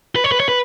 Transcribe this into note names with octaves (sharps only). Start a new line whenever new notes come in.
B4
C#5
B4
C#5
B4